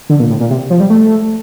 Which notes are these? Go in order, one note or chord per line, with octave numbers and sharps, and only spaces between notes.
D3
A#2
A2
A#2
C3
F3
G3
A3